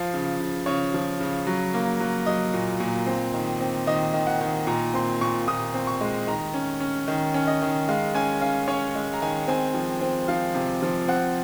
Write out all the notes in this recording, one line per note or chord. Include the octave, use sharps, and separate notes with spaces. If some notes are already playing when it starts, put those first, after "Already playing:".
Already playing: F3 F5
C#3
C#3
C#3 C#5
F3
C#3
F#3
A#3
F#3
F#3 D#5
A#2
A#2
C4
D#3
C4
D#3 D#5
D#3
F#5
D#3
A#2 A#5
C4 C6
A#2 C#6
A#2 D#6
C4
C#6
G#3
D#3 A#5
C#4
C#4
D#3
C#4
D#5
D#3
G#3 F5
C#4 G#5
C#4 F5
C#4 C#5
G#3
A#5
D#3 G#5
C4 G#5
F3
C4
F3 F5
C3
F3
C4 F#5